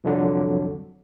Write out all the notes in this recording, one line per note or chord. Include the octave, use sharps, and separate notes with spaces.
C2 F2 D3 F#3